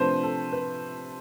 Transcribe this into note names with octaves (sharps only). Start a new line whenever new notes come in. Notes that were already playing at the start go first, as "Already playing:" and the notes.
Already playing: C3 F3 A3 D4 B4 C5
A4
B4